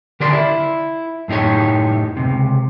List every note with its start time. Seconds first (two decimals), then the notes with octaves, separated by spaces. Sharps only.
0.20 D3 G4 A#4 D5 C6
0.33 E4
1.28 F#2 A2 D#4 G4 C#5
2.17 C#2 F#2 C3